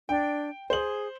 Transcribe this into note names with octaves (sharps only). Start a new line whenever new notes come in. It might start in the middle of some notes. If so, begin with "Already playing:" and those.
D4 G5
G#4 C5 F#7